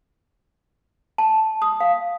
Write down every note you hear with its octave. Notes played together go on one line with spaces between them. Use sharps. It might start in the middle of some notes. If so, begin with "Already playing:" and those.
A5
D#6
F5